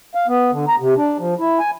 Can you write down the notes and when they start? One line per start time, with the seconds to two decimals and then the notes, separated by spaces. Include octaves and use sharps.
0.15 F5
0.28 B3
0.52 D3
0.68 A#5
0.79 C3
0.96 D4
1.19 F3
1.39 E4
1.59 G#5